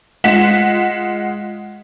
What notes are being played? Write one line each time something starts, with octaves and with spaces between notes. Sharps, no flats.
G#3 F4 F#5 B6 E7